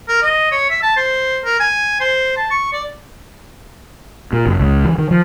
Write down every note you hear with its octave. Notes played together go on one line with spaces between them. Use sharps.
A#4
D#5
C#5
E5
A5
C5
A#4
G#5
C5
A5
C#6
D5
A#2
F#1
C#2
E3
D#3
F3